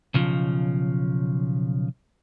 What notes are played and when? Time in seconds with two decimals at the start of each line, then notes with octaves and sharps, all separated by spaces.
0.14 B1 C#3 F3